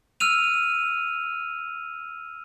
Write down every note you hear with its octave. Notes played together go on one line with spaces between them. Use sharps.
E6 F6 D#7 F7